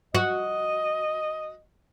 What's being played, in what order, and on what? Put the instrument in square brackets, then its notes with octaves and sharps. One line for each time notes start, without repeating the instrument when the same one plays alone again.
[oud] F#4 [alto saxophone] D#5